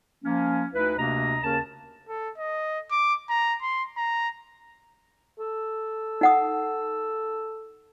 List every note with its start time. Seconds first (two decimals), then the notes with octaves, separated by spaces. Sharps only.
0.24 F3 A#3 C#4
0.74 D2 D#4 E4 B4
0.98 D2 C3 A#3 D4 D#5 A#5
1.42 D#2 C#3 C#4 A#4 A5
2.09 A4
2.38 D#5
2.91 D6
3.30 A#5
3.62 C6
3.97 A#5
5.39 A4
6.21 D#4 F#5 D#6